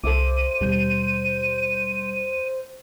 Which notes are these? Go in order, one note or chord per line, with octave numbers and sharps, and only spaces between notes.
C2 A4 C5 E5 D6 D#7
D#2 B2 G3 G6